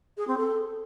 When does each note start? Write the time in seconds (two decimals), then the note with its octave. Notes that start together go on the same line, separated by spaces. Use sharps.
0.17 G#4
0.27 C4
0.37 A4